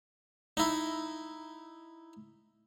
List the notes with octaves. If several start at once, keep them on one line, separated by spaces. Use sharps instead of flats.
D#4 E4